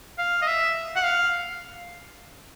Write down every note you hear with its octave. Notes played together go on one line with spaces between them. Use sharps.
F5
D#5
E5
F#5
F5